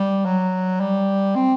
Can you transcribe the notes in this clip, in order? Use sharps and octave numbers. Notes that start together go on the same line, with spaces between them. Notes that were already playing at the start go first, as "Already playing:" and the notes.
Already playing: G3
F#3
G3
C4